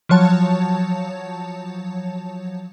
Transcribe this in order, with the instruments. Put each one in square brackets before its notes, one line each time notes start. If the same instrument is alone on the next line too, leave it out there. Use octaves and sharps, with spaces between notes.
[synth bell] F3 F#3 C#5 A5